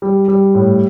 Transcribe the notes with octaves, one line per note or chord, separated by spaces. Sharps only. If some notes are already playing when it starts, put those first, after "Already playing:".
G3
G3
A2